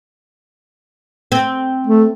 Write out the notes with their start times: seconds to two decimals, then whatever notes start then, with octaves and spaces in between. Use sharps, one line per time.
1.32 C4
1.87 A3